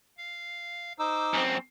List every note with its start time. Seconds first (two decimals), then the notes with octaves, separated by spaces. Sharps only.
0.17 F5
0.99 D#4 C5 D6 E6
1.34 F#2 C4